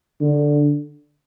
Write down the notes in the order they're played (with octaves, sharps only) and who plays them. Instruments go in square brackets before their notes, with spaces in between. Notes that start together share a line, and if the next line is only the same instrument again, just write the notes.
[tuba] D3